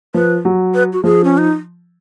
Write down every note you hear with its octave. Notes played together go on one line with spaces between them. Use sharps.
F3 B4
F#3
B4
F#4
F3 G#4
C#4
D#4